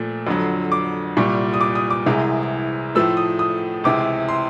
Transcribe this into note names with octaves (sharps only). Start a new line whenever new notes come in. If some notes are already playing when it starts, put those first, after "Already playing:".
Already playing: A#2 F3 A3
F2 D3 F#3
D6
C2 A#2 G3 C#6
D#6
D6
D#6
D6
C2 C3 E3 G#3
A2 F3 A3 E6
D#6
D#6
C#2 C3 E3 D6
C6